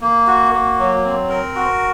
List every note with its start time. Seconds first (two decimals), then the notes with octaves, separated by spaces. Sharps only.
0.01 A#3
0.28 F#4
0.53 A#3
0.79 F#3
1.04 C4
1.29 A#4
1.55 F#4